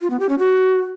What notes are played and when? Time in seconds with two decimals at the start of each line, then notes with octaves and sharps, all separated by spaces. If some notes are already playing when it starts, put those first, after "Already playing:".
0.01 F4
0.10 B3
0.20 G4
0.29 C#4
0.39 F#4